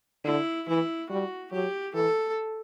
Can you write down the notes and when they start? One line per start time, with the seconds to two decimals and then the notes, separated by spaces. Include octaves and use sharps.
0.25 D3 E4
0.68 E3 E4
1.09 G3 F#4
1.52 F#3 G4
1.94 E3 A4